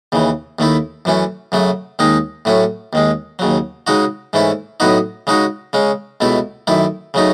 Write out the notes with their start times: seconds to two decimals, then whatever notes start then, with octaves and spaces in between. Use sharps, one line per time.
0.12 D#2 C#3 E3
0.59 D#2 D#3 A3 E4
1.05 F#2 E3 A3 C#4
1.52 F#2 C#3 F#3 A3
1.99 D#2 D#3 G#3 D#4
2.45 A2 F#3 A3 C#4
2.93 D#2 D#3 G#3
3.39 D#2 C#3 F#3
3.87 C#3 G#3 D#4 F#4
4.33 G#2 E3 A3 C#4 E4
4.80 A2 F#3 B3 D#4 F#4
5.27 C#3 G#3 D#4 F#4
5.73 C#3 G#3 C#4
6.21 C#2 B2 A3 E4
6.67 F#2 D#3 A3 E4
7.14 C#3 F#3 A3 D#4